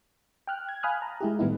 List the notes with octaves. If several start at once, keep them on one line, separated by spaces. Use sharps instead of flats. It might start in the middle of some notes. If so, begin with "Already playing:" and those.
G5 F6 F#6
G#6
F5 G#5 B5 D#6 F6 F#6
A5 A#5
G#3 E4 G4
A2 D#3 G3 B3 D#4 E4